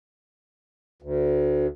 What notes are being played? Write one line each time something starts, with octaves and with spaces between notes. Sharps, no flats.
D2